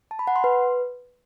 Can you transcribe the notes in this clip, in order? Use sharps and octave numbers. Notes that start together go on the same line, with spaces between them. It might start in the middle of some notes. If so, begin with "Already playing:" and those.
A5
B5
F#5
C6
B4